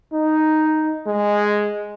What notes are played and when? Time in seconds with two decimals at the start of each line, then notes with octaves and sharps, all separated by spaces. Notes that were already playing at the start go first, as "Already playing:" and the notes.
0.13 D#4
1.07 G#3